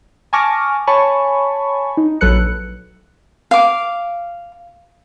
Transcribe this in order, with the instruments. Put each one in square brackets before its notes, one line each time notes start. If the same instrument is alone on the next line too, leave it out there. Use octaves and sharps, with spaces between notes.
[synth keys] G#5 A5 C#6 D6 F6 A#6
C#5 G#5 A5 B5 C#6
D#4
A#1 F#3 A4 B4 F#6 C#7
[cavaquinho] F5 D6